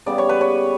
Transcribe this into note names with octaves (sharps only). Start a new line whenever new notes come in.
C#3 G3 B3 D5
C#5
B4
C#5